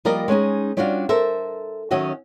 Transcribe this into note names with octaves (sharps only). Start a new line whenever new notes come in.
F3 G3 A#3 A#4 D5 D#5
G#3 C#4 D#4 G#4
G3 C#4 D4 F4 F#4 F5
A4 A#4 C5 E5
D#3 F#3 C#4 F#4 D#5 E5